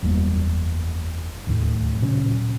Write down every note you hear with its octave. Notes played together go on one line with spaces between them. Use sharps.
F#1 E2 G3 A#3
D1 D#2 A2
A#2 C#3 F#3 C#4